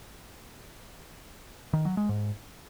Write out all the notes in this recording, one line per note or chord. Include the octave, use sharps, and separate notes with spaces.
D#3
F#3
G#3
G#2